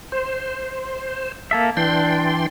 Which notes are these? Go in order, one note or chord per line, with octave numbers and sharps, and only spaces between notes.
C5
A#3 A4 E5
E3 D4 G5 C6